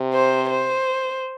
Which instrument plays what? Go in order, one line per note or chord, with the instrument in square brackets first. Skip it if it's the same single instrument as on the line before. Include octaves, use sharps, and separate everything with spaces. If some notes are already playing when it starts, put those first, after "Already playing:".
Already playing: [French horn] C3
[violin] C5
C5